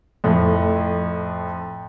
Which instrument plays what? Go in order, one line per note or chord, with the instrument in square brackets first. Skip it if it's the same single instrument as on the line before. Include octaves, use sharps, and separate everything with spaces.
[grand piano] F2 A2